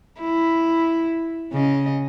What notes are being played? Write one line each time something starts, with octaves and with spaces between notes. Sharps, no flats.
E4
C#3 D#5